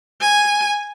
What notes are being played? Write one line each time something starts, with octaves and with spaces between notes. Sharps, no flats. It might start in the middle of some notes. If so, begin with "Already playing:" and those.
G#5